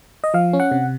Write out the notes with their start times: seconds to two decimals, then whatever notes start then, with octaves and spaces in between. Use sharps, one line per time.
0.24 D#5
0.34 F3 F5
0.53 C#4
0.60 F#5
0.72 C3